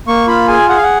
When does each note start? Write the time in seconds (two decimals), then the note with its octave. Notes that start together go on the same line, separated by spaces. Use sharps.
0.07 A#3 C#6
0.27 F4 B5
0.48 G#4 G#5
0.69 G#4 F#5
0.76 F5
0.83 F#5